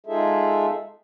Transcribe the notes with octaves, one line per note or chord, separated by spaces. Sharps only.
G#3 D#4 F4 G#4 A4 E5